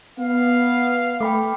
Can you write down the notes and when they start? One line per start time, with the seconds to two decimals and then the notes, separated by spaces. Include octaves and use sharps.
0.19 B3 F5
1.21 A3 G5 B5 D6